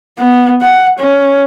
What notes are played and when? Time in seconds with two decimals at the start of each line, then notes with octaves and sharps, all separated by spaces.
0.18 B3
0.61 F#5
0.99 C#4